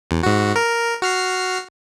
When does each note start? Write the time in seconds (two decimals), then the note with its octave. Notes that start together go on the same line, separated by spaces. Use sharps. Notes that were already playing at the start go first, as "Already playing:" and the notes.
0.11 E2
0.23 G#2 F#4
0.56 A#4
1.02 F#4 F6 C7